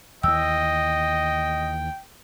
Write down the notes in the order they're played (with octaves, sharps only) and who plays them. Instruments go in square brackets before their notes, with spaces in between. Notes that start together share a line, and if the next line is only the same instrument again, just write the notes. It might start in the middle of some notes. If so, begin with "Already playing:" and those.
[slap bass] D#2 E3 [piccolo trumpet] D#5 [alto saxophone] G5 [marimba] E6